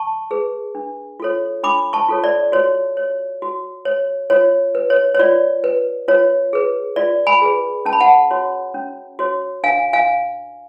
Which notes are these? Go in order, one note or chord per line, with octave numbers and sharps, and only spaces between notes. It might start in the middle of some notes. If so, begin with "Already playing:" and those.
Already playing: A5 C#6
G#4 B4
D4
F4 A4 C#5
D4 B5 D6
A5 C#6
F4 A4 C#5
D5
F#4 C#5
C#5
F#4
C#5
F4 C#5
B4
C#5
C#5
F4 D5
B4
F4 C#5
G#4 B4
F4 D5
G#5 B5
G#4 B4
C#4 A5
B5
F#5 A5
F#4 C#5
C#4
F#4 C#5
D4 F5 G#5
F5 G#5